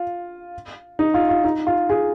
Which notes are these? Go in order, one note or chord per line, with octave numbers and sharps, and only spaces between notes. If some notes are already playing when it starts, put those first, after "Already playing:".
Already playing: F4
D#4
F4
F4
D#4
F4
F4 G#4